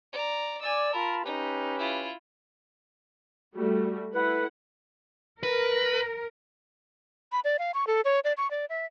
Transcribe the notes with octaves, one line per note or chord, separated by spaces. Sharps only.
D5 A#5
D5 G#5 E6
F4 A#4 A5 B5
C#4 D#4 G4 B4
E4 F4
G3 A3 F#4
E4 A4 B4 F#5
A#4 B4
B5
D5
F5
C#6
A4
C#5
D5
C#6
D5
E5